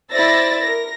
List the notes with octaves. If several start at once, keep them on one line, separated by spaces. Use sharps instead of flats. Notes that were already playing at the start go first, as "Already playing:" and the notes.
E4 C5 D5 E6 A6 A#6
A#4 A#6